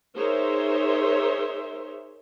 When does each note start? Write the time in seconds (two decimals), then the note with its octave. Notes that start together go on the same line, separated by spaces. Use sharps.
0.16 D#4 G#4 A#4 C5 C#5 E5